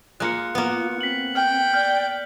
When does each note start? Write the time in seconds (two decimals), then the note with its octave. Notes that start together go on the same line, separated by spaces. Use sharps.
0.20 G#3 A#3 F4 F#6 C#7
0.55 A#3 B3
1.01 C4 B6 F#7
1.35 G5 F6
1.74 D5 F6 G6